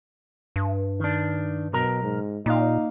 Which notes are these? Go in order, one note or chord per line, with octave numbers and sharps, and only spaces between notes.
G2
D#3 D4
B1 B2 A#4 A#5
G#2
A#2 A#3 D#4 F5